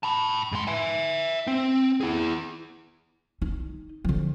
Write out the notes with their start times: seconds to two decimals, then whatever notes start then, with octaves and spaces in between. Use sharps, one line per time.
0.03 A5 B5
0.52 G#2 C6
0.67 E5 G#5
1.47 C4
2.01 E4 G#4
3.42 D#4
4.04 D3 F3